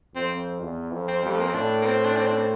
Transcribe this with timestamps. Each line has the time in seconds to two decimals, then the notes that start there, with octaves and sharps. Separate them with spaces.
0.15 F2 C4
0.61 E2
0.93 F2
1.08 C4
1.23 F2 G3
1.32 A3
1.40 A#3
1.47 C4
1.54 A2 D4
1.82 A#3
1.86 C4
2.05 D4
2.17 C4
2.27 D4
2.37 C4